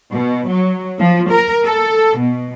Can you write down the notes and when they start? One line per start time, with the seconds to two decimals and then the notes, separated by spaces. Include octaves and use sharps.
0.13 B2
0.49 F#3
0.99 F3
1.31 A#4
1.65 A4
2.19 B2